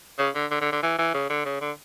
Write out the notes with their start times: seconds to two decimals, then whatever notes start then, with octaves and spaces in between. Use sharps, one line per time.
0.19 C#3
0.35 D3
0.51 D3
0.61 D3
0.72 D3
0.83 E3
0.98 E3
1.14 C#3
1.30 D3
1.45 C#3
1.61 D3